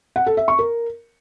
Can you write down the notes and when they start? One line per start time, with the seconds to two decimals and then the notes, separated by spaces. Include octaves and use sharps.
0.16 F#5
0.26 A4
0.37 E5
0.48 C#6
0.59 A#4